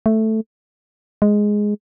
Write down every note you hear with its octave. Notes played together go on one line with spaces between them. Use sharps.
A3
G#3